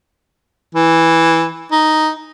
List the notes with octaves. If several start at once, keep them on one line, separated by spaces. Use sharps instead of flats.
E3
D#4